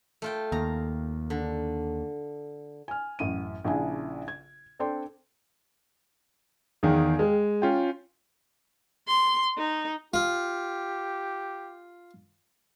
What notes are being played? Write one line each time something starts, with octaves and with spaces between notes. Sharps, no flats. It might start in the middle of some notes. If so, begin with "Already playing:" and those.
A3 F4 G5
D#2 A#5
D3
G#5 F6
A1 F#2 D#7
A#1 C#3 D4 E4 G#5
G#6
C4 D4 A4 D5 G5 C6
E2 D#3 G#4 F5 G5
G#3
C#4 F4 G5
C6
D#4
F4 G4